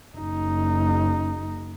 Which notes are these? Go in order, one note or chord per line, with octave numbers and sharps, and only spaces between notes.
F#1 D#4